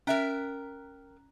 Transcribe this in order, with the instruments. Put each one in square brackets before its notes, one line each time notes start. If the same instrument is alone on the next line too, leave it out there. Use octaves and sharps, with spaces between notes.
[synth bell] C#4 A#5 F#6 [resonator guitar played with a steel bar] A#4 E5 G5